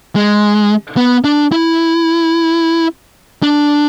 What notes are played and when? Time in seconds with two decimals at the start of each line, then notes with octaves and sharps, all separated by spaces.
0.16 G#3
0.97 B3
1.24 D4
1.52 E4
3.43 D4